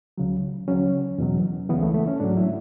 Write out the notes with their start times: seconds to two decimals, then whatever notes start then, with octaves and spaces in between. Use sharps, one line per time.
0.18 C#2 C#3 F#3
0.68 D2 C#3 F#3 C#4
1.18 E2 B2 F#3
1.69 C#2 C#3 E3 B3
1.83 A3
1.94 A3
2.08 C#4
2.20 G#2 F#3 D4
2.37 E4